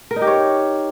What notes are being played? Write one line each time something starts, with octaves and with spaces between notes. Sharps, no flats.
A#4
D#4
G4
C#5